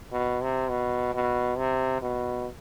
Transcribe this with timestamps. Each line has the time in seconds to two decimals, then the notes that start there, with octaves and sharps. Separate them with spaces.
0.12 B2
0.42 C3
0.70 B2
1.14 B2
1.58 C3
2.02 B2